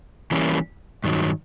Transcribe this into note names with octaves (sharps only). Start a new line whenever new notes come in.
E3 G3 A#3 C#4
G2 D#3 F#3